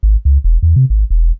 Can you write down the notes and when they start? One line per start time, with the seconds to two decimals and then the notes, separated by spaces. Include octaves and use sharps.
0.03 G#1
0.25 C#2
0.44 E1
0.63 E2
0.76 C3
0.90 G#1
1.10 E1